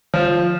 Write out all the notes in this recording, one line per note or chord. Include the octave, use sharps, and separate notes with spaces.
F3